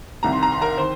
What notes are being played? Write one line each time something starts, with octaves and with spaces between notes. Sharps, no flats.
C2 C3 D#3 A#5
C6
A#5
C6
A#4 A#5
D#3 C5 C6